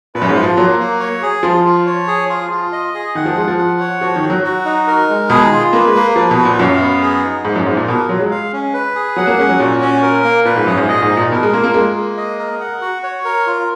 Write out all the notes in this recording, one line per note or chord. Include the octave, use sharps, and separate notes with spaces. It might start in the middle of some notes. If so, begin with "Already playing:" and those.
A#2 B4
F#2
G#2
F4
F3
F#3 A#3
A#3
C#5
G#4
F3 F4
F4
C#5
G#4
F4
F4
D#5
G#4
D#3 F#5
F3
G#3 F4
F3
F#5
C#5
F3 F#4
D#3
F#4
F#3
F#4
D#4
A#4
G#3
B2 G#4
D#3
F4
A#3 B4
G#3
A#3
F3 B4
B2
F#4
A#2
F#2 F5
B3
G#4
D#4
G#2 A#3
F#2
G#2 A#3
A#2
B2 A#4
F#3 F4
G#3
F5
C#4
B4
G#4
F#3 F#5
A#3
G#3 C#4
F#3
A#2 F#4
C#4
A#4
A#3
A#2 B4
G#2
F#2 G#4
G#2
A#2 D#5
G#2
D#4
A#2
B2 A#4
G#3
A#3 F4
A#3
G#3 A#3
A#3
D#5
A#4
F#5
F#4
C#5
A#4
F4